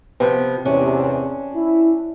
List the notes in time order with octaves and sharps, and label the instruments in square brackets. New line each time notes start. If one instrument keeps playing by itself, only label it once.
[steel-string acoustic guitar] C3 F3 B3
[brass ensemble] E2 A2 C3 [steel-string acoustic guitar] C#4 D4
[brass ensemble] E4